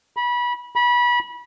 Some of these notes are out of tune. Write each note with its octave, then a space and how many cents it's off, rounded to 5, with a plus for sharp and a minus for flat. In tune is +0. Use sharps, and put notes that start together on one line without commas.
B5 -25
B5 -25